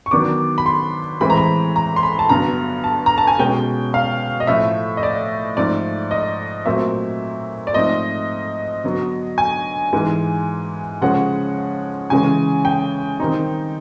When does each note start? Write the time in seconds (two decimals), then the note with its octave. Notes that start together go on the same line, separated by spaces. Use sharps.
0.06 C#6
0.11 D#3 F#3 B3 D4 D6
0.58 B5
0.66 C6
1.21 A2 E3 G#3 C4 B5
1.30 A#5
1.37 B5
1.76 A#5
1.96 C6
2.03 B5
2.19 A5
2.29 G2 D3 F#3 B3 A#5
2.84 A5
3.06 A#5
3.18 A5
3.27 G#5
3.39 B2 G#3 C#4 G5
3.94 F5
4.40 D#5
4.47 A2 F3 A3 E5
4.97 D#5
5.03 D5
5.57 G#2 F3 A3 D5
6.11 D#5
6.66 A#2 F#3 A3 C4 E5
7.67 D5
7.74 G#2 F3 A3 C4 D#5
8.84 D3 F#3 B3
9.38 G#5
9.93 G#2 E3 G#3
11.01 C#3 F3 G#3 C#4 F#5
12.10 C#3 E3 G#3 C#4 G#5
12.65 G5
13.20 D#3 G3 C4 D#4